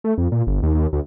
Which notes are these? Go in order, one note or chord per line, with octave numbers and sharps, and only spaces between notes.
A3
F2
A#2
G1
D#2
D#2
D2